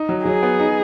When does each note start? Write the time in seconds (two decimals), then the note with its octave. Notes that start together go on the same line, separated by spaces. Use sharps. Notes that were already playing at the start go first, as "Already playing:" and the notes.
Already playing: D#4
0.09 F#3
0.25 F#3 G#4
0.43 B3
0.60 D#4